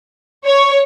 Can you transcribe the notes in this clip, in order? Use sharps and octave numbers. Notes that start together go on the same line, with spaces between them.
C#5